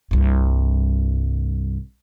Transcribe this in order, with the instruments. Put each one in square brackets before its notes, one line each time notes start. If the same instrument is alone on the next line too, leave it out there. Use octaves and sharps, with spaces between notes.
[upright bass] C2 G2